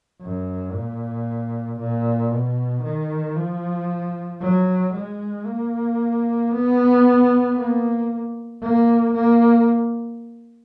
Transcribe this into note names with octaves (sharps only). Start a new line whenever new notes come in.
F#2
A#2
A#2
B2
D#3
F3
F#3
G#3
A#3
B3
A#3
A#3
A#3